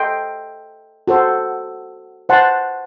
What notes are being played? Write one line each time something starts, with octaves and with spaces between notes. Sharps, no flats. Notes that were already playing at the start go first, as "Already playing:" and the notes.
Already playing: A4 D#5 G5 C6
F#4 A4 C5
C5 F#5 A5 C6